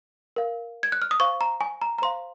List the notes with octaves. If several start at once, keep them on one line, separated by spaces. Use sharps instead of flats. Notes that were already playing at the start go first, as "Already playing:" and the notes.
A#4 F5
G#6
F#6
F6
D#6
C5 F5 C#6
A#5
G#5
A#5
A#5
C5 F5 C6